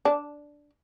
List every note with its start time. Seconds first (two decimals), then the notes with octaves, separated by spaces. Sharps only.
0.05 D4